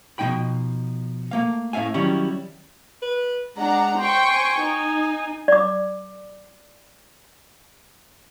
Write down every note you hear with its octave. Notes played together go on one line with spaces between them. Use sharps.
B2 F3 A#3 D#4 G5 B5
A3 A#3 F5
A2 C#4 E5 F5 G#5
D#3 F#3 G3 C#4 E4
B4
G#3 D4 F#5 A#5
C5 G5 C#6
G#5
D#4
D5 D6